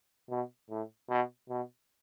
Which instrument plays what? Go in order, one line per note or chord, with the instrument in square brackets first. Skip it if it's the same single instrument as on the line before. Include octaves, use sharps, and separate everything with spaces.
[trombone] B2
A2
B2
B2